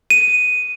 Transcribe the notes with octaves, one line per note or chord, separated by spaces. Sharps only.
D#7